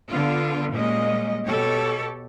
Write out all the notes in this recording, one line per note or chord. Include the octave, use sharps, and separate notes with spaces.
D3 B3 F4
A#2 G3 G#3 A#3 C#4 D#5
B2 G4 A4 C#5